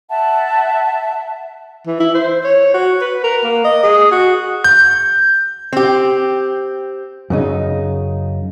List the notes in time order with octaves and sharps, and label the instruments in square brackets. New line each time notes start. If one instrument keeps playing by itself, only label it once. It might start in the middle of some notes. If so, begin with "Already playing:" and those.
[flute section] E5 F#5 A5
[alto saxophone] E3
E4
C5
C#5
F#4
B4
A#4
A#3
D#5
G#4
F#4
[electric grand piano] G6
[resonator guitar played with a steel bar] C4 G4
[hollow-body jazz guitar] F#2 C#3 D#4